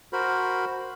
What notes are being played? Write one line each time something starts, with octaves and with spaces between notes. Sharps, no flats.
F#4 A#4 C5 B5